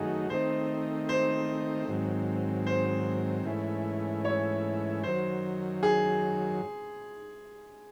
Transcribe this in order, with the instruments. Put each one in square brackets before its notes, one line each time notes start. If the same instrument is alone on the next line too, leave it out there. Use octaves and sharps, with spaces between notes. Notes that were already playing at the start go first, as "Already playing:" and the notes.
Already playing: [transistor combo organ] F#2 D#3 A3 D#4 F#4 [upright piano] G#4
[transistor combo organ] D#3 A3 C4 D#4 [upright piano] C5
[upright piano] C5
[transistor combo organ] G#2 D#3 F#3 C4
[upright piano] C5
[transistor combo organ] G#2 E3 A3 C#4 E4
[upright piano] C#5
[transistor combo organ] F#2 D#3 F#3 [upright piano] C5
[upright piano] G#4